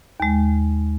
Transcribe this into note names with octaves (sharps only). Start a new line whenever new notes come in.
D#2 G#3